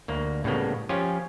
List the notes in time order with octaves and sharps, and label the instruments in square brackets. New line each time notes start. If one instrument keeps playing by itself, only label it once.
[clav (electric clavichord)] D2 A#3
A2 C#3 G3 A#3 B3
F3 C#4 F4 G4